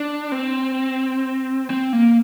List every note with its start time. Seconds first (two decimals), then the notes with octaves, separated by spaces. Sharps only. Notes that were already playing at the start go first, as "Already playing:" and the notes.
Already playing: D4
0.32 C4
1.70 C4
1.93 A#3